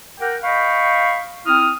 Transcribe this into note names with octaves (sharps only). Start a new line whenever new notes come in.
A#4 F#5 G5
D#5 F5 G5 B5 C#6
C4 E4 D#6 F6